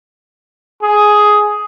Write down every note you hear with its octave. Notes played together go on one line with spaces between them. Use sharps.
G#4